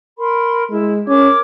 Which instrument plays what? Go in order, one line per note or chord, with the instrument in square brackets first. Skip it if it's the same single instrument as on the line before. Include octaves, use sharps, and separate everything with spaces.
[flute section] A#4 B5 C6
[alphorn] G#3 [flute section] E4
[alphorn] C#4 [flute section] A#4 D6 G#6